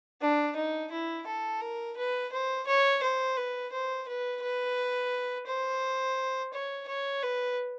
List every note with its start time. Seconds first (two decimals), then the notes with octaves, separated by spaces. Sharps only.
0.21 D4
0.56 D#4
0.92 E4
1.27 A4
1.61 A#4
1.97 B4
2.32 C5
2.67 C#5
3.03 C5
3.37 B4
3.72 C5
4.08 B4
4.43 B4
5.47 C5
6.53 C#5
6.88 C#5
7.23 B4